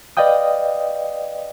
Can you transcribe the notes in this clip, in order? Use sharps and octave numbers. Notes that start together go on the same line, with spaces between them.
B4 D5 D#5 F5 G5 D#6